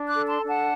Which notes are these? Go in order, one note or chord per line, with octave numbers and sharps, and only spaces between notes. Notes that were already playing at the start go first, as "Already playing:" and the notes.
Already playing: D4
D6 F#6
A4
A5 C6
D4
F#5 A5